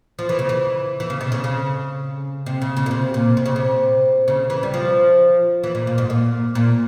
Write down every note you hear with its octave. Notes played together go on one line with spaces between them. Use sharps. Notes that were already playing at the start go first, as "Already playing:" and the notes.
F3
E3
C#3
E3
E3
C#3
C3
C#3
C#3
C3
C#3
C#3
A#2
C3
A#2
C3
C#3
C3
C#3
E3
G3
F3
E3
A#2
A#2
G#2
A#2
A#2